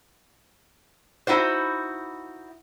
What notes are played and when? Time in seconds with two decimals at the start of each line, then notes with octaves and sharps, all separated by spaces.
1.27 D#4 E4 F#4 C5